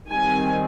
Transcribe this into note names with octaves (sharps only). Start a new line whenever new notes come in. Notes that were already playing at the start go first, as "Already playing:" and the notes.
D#3 G3 C4 G#5